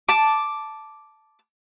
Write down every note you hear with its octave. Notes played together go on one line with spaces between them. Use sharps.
A5 D6